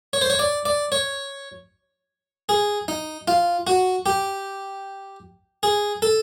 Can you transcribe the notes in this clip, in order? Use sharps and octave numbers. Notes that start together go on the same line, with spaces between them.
C#5
C5
C#5
D5
D5
C#5
G#4
D#4
F4
F#4
G4
G#4
A4